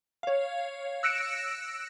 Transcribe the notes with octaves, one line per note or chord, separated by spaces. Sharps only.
C#5 F5
E6 F#6 A#6 C#7 D7 E7